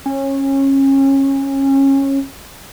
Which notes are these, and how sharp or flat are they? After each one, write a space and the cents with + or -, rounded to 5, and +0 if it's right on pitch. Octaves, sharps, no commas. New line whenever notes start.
C#4 -25